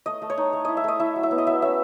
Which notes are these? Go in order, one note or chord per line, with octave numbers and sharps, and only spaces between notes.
A3 D#5
A3
C#5
D#4
A3
E4 D#5
E5
A3 D#5
E4 E5
F#3
E5
B3
D#5
F#3 E5
C#4 E5